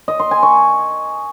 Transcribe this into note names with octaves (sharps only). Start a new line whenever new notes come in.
D#5
C6
G#5
C#6